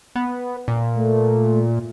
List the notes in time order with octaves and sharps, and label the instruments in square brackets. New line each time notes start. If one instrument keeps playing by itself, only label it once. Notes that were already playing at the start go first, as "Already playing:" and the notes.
[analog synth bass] B3
A#2
[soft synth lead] A3